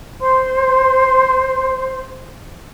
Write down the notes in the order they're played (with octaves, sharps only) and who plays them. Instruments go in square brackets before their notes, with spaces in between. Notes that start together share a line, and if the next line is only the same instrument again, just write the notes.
[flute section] C5 C6